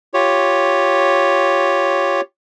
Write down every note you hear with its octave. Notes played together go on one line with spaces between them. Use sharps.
F4 G4 C#5